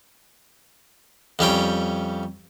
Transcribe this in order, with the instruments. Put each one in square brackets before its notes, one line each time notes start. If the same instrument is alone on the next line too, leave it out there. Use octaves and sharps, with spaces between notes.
[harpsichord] F2 G3 C#4 G5